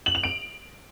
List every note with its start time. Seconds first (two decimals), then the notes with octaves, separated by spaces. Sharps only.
0.06 F#7
0.15 F7
0.24 D7